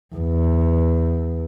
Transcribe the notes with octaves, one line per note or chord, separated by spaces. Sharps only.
E2